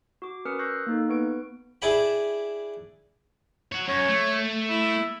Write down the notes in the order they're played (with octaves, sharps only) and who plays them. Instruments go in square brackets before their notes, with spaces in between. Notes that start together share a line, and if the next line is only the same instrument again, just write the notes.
[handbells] F#4 D6
C#4 A#4 B4 D#6 F6 C#7
C#6 E6 F#6 G6 A#6 C7
A#3 D#4 A4
B3 B4 C#6 D7
[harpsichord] D4 E4 G#4 D5 G5 B5
[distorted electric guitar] C#5 F#5
[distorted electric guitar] F#2 [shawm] C#5
[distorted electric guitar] A3
[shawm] E4